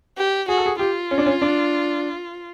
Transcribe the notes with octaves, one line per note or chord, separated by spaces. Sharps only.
G4
F#4 G#4
A4
G#4
F4 G4
C#4
D4
C#4
D4